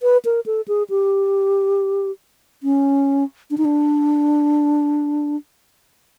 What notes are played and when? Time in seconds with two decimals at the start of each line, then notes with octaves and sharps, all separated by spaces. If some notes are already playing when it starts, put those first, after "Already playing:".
0.02 B4
0.25 A#4
0.46 A4
0.68 G#4
0.90 G4
2.63 C#4
3.51 D4
3.58 D#4
3.65 D4